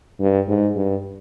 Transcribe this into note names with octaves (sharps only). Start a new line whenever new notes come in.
G2
G#2
G2